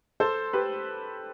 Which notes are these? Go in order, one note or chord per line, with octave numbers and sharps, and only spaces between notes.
A4 C5
G4 B4